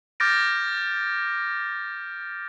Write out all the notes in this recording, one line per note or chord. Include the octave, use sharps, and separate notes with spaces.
D6 F6 G6 A6 A#6 D7